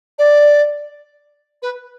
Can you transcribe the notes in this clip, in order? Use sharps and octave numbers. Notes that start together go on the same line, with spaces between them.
D5
B4